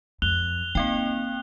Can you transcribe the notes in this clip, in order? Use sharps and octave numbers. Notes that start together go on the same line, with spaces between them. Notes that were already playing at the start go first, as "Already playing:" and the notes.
F2 F#6 F7 G7
A#3 C4 D#4 G5